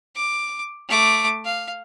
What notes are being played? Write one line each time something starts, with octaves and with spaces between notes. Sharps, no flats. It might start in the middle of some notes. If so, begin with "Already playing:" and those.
D6
A3 D6
F5